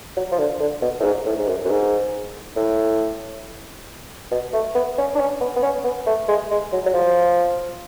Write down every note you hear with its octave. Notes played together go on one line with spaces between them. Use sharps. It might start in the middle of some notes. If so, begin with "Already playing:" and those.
F#3
F3
D3
D3
B2
A2
G#2
A2
G#2
F#2
F#2
G#2
A2
B2
A3
B3
C#4
D4
C#4
B3
B3
C#4
B3
A3
G#3
G#3
F#3
F#3
F3